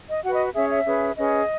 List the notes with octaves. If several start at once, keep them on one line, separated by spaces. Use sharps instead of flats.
D#5
F#4 B4 F#5
D#5
C#4 G#4 C#5 E5
E5
C#4 G#4 B4
C#4 G#4 B4 D#5